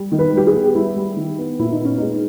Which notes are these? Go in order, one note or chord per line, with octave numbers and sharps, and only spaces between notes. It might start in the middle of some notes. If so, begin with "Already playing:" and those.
Already playing: G3
D#3
B4
G3 G4
G#4
B3
G3 E4
G3
D#3
B3
A#2 E4
D#4
B3 C#4
G#3 D#4